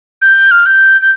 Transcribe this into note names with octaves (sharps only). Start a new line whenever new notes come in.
G6
F6
G6
G6